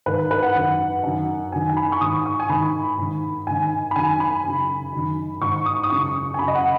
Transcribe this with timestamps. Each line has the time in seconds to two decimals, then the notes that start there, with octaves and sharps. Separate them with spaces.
0.06 G#2 D#3 B4
0.31 B4
0.43 F#5
0.55 F#2 D#3
1.03 F#2 D#3
1.52 F#2 D#3 G#5
1.69 G#5
1.77 B5
1.92 C#6
2.01 G#2 D#3 D#6
2.26 C#6
2.40 G#5
2.49 G#2 D#3 B5
2.98 G#2 D#3
3.47 G#2 D#3 G#5
3.91 B5
3.95 F#2 D#3 G#5
4.20 B5
4.44 F#2 C#3
4.93 F#2 D#3
5.41 G#2 D#3 C#6
5.66 D#6
5.84 D#6
5.90 F#2 C#3 C#6
6.34 G#5
6.39 F#2 C#3 B5
6.48 D#5
6.55 F#5